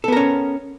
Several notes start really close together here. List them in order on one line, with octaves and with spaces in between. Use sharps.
A4 B3 A#4 C#4